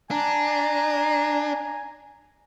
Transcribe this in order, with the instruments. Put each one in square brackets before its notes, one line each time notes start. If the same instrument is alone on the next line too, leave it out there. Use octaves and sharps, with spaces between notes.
[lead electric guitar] D4 [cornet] G#5 [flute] A#5